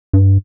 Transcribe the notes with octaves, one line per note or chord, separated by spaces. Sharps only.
G2